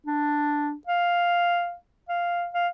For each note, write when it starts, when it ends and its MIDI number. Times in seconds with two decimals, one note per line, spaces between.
0.07 0.73 62
0.87 1.74 77
2.09 2.48 77
2.54 2.68 77